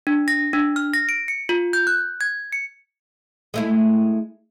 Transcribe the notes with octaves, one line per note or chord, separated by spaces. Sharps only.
D4
A#6
D4
F6
A#6
D7
C#7
F4
G6
F#6
G#6
C#7
G#3 A3 E4